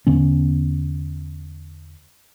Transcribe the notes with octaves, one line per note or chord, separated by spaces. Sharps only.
E2 D3 B3 C#4